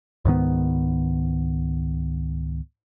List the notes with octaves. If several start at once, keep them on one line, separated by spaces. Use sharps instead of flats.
C#2 G#2 D#3 B3